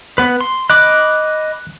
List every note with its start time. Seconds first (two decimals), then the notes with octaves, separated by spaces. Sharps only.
0.18 B3 B4
0.41 C6
0.70 D#5 B5 D6 F#6